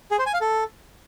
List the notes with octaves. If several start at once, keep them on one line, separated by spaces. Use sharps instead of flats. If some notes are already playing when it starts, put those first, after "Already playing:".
G#4
C5
G#5
F5
A4